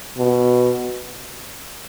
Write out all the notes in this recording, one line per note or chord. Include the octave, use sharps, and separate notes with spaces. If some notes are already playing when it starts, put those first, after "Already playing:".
B2